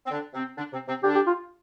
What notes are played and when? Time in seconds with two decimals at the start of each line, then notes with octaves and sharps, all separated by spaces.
0.06 C4
0.11 D3 D4
0.34 C3 C4
0.57 D3 D4
0.72 C3 C4
0.88 C3 C4
1.03 D3 D4 G4
1.15 G4
1.27 F4